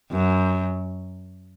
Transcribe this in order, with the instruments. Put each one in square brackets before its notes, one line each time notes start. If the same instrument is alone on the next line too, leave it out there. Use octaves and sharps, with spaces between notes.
[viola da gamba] F#2